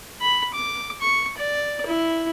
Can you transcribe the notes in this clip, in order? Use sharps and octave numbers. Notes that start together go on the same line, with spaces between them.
B5
D6
C#6
D5
E4